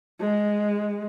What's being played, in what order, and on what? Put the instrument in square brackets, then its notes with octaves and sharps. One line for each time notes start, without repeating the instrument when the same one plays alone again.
[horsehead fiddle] G#3